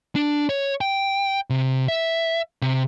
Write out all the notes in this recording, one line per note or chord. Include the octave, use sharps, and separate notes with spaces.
D4
C#5
G5
C3
E5
C3